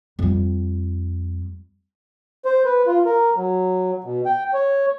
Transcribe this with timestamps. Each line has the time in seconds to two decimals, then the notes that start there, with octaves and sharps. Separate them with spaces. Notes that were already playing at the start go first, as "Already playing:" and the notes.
0.19 F2 G3
2.45 C5
2.65 B4
2.87 F4
3.05 A#4
3.36 F#3
4.04 B2
4.26 G5
4.54 C#5